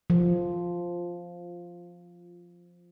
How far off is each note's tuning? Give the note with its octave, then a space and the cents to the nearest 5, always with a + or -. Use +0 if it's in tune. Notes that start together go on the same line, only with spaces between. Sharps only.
F3 +0